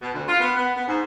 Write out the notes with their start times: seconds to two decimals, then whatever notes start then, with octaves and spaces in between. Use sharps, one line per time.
0.01 B2
0.13 D2
0.28 F4
0.40 B3
0.56 B3
0.76 B3
0.87 G#2